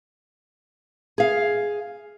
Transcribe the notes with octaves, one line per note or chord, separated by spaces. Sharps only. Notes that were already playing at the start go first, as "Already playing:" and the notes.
G#4 F5